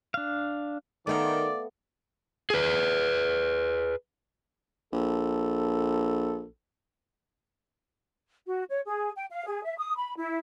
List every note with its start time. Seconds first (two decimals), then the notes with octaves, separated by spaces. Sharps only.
0.14 D4 F5
1.07 D#3 A3 B3 D5 F5
2.50 G#4 B4
4.93 A#1 A4
8.46 F#4
8.69 C#5
8.85 G#4
9.15 G5
9.30 F5
9.46 G#4
9.65 E5
9.77 D#6
9.96 B5
10.17 E4